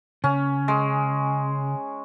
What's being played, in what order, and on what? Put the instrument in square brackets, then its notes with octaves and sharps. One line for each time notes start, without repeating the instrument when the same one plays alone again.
[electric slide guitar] C#3 [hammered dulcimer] C#4
[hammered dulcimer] G#3